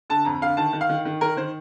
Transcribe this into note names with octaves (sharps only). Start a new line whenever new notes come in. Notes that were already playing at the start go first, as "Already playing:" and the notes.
D3 A5
F2 A#5
D3 F5
D#3 A5
D#3
F5
D#3
D#3
D#3 A#4
D#3 C5